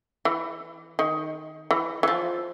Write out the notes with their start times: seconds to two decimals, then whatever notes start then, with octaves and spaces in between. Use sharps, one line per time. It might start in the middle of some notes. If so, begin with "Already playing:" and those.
0.25 E3
0.99 D#3
1.71 E3
2.03 E3
2.08 F3